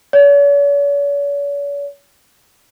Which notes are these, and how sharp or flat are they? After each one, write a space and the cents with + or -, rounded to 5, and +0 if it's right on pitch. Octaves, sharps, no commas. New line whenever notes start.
C#5 +45